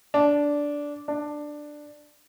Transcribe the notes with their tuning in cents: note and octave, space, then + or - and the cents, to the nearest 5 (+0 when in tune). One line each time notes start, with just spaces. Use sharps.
D4 -10
D4 +10